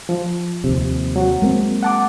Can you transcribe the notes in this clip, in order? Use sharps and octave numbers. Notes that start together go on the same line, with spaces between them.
F3
D#2 C3
F#3 F#4
G#3 A#3 C4
F#5 A5 D6